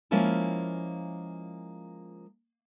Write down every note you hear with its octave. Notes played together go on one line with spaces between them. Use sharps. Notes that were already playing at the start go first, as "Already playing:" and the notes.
F3 G#3 A#3 C#4 E4 F4